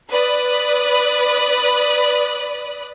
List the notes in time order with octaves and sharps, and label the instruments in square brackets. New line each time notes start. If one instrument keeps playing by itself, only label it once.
[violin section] B4 D5 B5 D#6 F#6